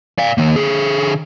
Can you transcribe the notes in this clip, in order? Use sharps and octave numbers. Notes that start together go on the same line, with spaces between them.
D5 F5
D#3 A#3
D3 G#4